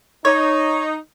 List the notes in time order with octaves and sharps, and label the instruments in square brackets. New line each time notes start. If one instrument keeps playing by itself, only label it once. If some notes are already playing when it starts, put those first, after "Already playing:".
[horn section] D#4 [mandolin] C#5